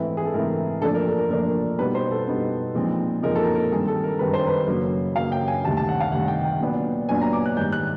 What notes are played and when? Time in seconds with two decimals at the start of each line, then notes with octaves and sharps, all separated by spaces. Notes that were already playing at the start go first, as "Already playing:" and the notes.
Already playing: G#2 E3 A3 C4 E4 B4
0.17 G#4
0.25 A4
0.34 G#2 E3 A3 C4 E4 A#4
0.82 A#2 F3 A3 D4 A4
0.95 A#4
1.06 A4
1.18 A#4
1.30 A#2 F3 A3 D4 A#4
1.78 B2 G3 B3 D#4 B4
1.95 C5
2.11 A4
2.27 B2 G3 B3 D#4
2.75 A#2 F3 G#3 C4 D#4
3.23 A#2 F3 G#3 C4 D#4 A#4
3.35 A4
3.40 A#4
3.55 A#4
3.72 G2 D#3 G#3 C4 G#4
3.88 A4
4.04 A#4
4.19 G2 D#3 G#3 C4 B4
4.34 C5
4.47 B4
4.68 F#2 C#3 F#3 A#3
5.16 F#2 C#3 F#3 A#3 F5
5.32 G5
5.48 G#5
5.64 D2 C3 D#3 G3 A5
5.77 A5
5.89 F#5
6.01 F5
6.12 D2 C3 D#3 G3 F#5
6.28 G5
6.44 G5
6.61 A#2 F#3 B3 D4
7.09 A#2 F#3 B3 D4 G#5
7.21 A#5
7.33 D6
7.46 F#6
7.57 G#2 D#3 G3 G6
7.72 F#6